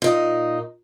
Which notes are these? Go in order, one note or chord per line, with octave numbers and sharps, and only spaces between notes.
A#2 D#4